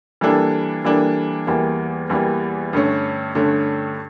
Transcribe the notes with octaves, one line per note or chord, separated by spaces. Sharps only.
E3 G3 A#3 D4 A4
E3 G3 A#3 D4 A4
E2 E3 G3 A#3
E2 E3 G3 A#3
G2 D3 A3 C#4
G2 D3 A3 C#4